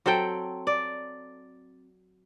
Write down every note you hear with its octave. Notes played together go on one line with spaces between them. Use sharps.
F#3 C4 A4 G5
D5